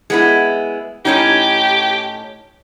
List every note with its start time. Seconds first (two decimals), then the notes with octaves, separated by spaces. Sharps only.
0.10 G#3 B3 E4
1.05 A2 C#4 D#4 G4